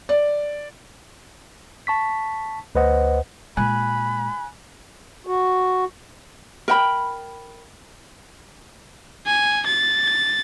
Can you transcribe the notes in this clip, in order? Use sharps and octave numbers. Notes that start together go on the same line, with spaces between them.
D5
A5 C#6 B6
D2 B4 C5 D#5 F#5
A#2 G#3 G#5 B5 F#6
F#4
A#4 G5 B5
G#5
A6